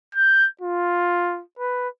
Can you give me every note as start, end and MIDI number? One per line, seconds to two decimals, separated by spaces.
0.15 0.47 91
0.61 1.42 65
1.59 1.88 71